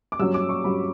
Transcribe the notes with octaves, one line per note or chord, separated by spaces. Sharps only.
D6
G2 F#3 C#4 E6
D6
C#6
G2 F#3 C#4 B5